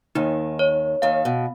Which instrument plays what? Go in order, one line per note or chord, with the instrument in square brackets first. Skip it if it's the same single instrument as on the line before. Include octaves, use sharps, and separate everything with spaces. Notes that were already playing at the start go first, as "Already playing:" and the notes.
[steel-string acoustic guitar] D#2 D#3 [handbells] D#4
[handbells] C#5
[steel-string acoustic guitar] D#2 D#3 [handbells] F5
[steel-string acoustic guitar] B2